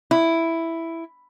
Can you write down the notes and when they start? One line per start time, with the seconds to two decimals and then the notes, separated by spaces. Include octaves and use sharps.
0.11 E4